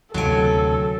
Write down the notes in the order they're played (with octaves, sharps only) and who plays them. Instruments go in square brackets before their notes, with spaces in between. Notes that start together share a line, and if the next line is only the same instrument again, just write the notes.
[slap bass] D2 C3 [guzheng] F#3 G#5 [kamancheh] A4